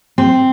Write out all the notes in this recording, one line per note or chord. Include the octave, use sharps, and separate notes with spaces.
C4